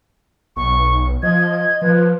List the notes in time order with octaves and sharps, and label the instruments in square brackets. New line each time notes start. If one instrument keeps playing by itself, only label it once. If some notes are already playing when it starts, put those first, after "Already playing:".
[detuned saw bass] B1 [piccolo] C#6
[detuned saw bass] F3 [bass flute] D#5 [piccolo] G#6
[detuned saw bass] F3 [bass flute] B4